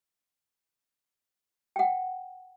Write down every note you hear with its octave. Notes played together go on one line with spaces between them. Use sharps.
F#5 G5